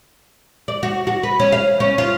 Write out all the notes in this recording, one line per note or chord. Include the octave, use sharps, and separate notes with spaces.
D5
F#4
F#4
B4
C#4
F5
C#4
F4